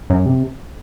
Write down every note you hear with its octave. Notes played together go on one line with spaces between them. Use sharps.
F#2
C3